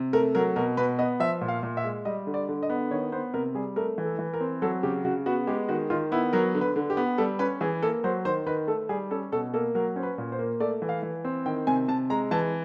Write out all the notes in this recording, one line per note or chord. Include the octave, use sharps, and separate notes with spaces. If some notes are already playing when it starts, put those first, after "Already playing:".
Already playing: C3
A3 A#4
F#3 A#4
B2 A#4
B2 B4
B3 D#5
F3 E5
A#2
F5
A#2
E5
G#3
G3 D#5
D3
D5
D3
D#5
B3
D#3 C#5
B3 C5
C3 A#4
G3 G#4
A3 A#4
E3
A4
E3
A#4
C4
F#3 A4
C#3 G4
C#3 F#4
B3 F#4
G#3 G4
D#3 F#4
D#3 F4
B3 E4
F#3 A#4
D3
B4
D3
G4
B3
G3 A4
C#4 B4
E3 G#4
A#3 A4
F#3 C5
D#3 C5
D#3 B4
A3 A4
G3 G#4
C#4 A4
B2 A4
A#3 A4
F#3 A#4
C#4 C5
B4
A#2
C5
A#3
A3 D5
E3
F5
E3
C4
D#3 G5
C3 G#5
C3 A5
G#3 A#5
E3 A5